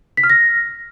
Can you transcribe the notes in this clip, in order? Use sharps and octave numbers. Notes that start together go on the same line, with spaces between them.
B6
F6
A#6